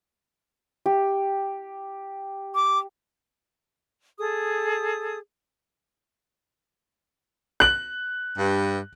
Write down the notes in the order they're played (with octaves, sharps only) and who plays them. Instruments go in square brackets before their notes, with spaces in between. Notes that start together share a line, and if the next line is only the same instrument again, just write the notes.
[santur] G4
[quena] D6
[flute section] G#4 A4 D#6
[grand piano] F#6 F#7
[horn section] G2